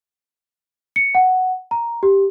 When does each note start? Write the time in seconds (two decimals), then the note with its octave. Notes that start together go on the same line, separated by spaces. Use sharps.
0.96 C#7
1.15 F#5
1.71 A#5
2.03 G4